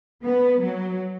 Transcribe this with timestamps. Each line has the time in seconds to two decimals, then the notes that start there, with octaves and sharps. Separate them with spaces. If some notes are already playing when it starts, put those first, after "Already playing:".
0.24 B3
0.61 F#3